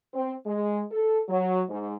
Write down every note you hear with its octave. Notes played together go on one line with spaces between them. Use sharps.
C4
G#3
A4
F#3
G#2